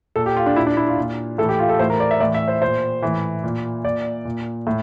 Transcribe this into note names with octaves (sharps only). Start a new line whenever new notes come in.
A#2 A4
G4
F4
D4
A#2 E4
D4
E4
F4
A#2
A2 E3 A4
G4
F4
A4
A2 E3 C5
A#4
D5
E5
A2 E3 D5
E5
C5
A#2 C5
A2 E3
A#2
A#2 D5
A#2
A2